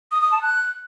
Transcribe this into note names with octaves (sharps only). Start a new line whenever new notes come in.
D#6
D#6
A5
F#6